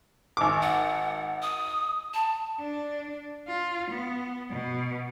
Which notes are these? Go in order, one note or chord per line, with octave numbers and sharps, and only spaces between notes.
G#1 D6
F#5
D#6
A5
D4
F4
B3
B2